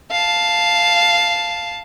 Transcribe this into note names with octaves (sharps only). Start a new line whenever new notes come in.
F5 A5